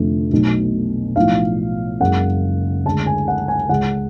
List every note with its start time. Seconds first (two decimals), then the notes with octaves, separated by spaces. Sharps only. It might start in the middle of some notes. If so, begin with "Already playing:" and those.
Already playing: F1 F2 D3 F3 A3
0.31 B1 B2 F#3 A3
1.16 B1 A2 F3 F5
2.00 F#1 F#2 C#3 G#3 F#5
2.85 D2 D3 G#3 A5
3.06 G#5
3.28 F#5
3.48 G#5
3.69 C#2 C#3 G#3 F#5